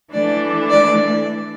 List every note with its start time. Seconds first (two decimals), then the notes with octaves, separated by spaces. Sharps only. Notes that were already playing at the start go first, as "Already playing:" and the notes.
0.13 E3 A3 D4 D5
0.70 D5